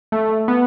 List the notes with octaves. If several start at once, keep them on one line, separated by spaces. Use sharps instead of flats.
A3
B3